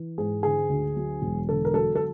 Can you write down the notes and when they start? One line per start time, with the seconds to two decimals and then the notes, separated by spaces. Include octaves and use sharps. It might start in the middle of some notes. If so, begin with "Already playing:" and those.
Already playing: E3
0.18 G#2 G#4
0.43 D3 G#4
0.69 D2
0.96 F#3
1.22 E1
1.49 D3 A4
1.65 A#4
1.74 F#3 A4
1.96 A4